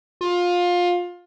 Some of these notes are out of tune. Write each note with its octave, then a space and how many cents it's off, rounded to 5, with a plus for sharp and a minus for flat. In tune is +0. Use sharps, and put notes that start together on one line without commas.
F4 +20